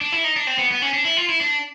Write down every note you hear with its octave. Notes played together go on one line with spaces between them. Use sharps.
D4
E4
D#4
D4
C4
B3
B3
C#4
D4
E4
F4
E4
D4